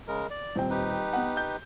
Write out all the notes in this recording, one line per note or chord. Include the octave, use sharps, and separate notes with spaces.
C#3 G#3 A#4
D5
D#1 C4 G5
D#4 G4 B4
B3 F#5
G6